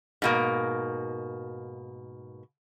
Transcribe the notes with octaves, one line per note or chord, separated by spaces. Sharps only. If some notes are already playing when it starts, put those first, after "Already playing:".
G#2 B2 A#3